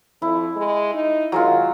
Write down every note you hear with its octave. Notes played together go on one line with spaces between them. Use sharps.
F2 E4
G#3
D#4
D#3 F#3 G#3 F4